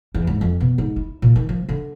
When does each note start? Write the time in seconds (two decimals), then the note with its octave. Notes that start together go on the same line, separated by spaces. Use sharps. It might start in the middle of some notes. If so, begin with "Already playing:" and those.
0.14 E2
0.27 G#2
0.41 F2
0.60 B2
0.78 G#2
0.96 E4
1.22 A#2
1.36 D#3
1.49 F3
1.69 D3